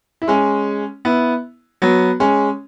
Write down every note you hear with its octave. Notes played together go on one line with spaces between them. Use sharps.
E4
G#3 C#4
B3 E4
F#3 B3
G#3 C#4